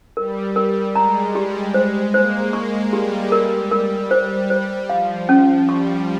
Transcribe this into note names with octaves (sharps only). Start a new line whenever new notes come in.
G3 A#4
A#4
G#3 A#5
G3 G4
G#3 C5
A#3 C5
G#3 C#6
G3 G4
A#4
A#4
C5
C5
F3 F5
C#4
G3 C#6